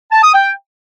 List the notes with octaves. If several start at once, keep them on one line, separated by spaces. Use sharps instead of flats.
A5
D#6
G5